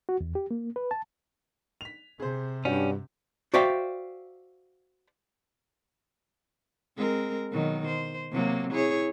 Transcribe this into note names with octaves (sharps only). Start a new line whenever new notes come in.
F#4
E2
G4
A#3
B4
A5
B6 F7
C3 G#4 C5
G2 C#4 D4 F#4 G4
F#4 C5 D5 E5 F5 G5
G#3 C4 A#4
B2 D#3 F#3
C5
C3 F#3 A#3
E4 G#4 C#5